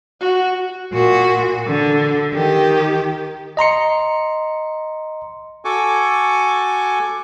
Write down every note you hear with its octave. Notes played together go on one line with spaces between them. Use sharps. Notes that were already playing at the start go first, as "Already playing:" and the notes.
F#4
A#2 F#4
D3
D#3 G4
D#5 A#5 C6 C#7
F#4 A4 G#5 C#6 D6